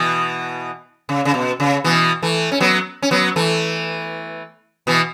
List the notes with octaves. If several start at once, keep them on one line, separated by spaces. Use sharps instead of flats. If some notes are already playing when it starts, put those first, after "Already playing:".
Already playing: B2 E3
C#3
C#3
B2
C#3
B2 E3
E3 A3
C#4
F#3 B3
C#4
F#3 B3
E3 A3
B2 E3